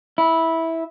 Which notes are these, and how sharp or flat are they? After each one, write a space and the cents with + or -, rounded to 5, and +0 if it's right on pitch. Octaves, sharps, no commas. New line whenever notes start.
E4 -10